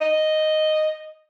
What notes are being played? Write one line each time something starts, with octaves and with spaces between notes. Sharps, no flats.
D#5